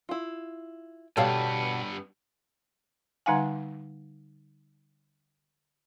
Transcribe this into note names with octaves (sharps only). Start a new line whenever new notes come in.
E4 F4
G2 B2 G3 B3 A4 C#5 F5
D3 G3 D#4 F5 F#5 G#5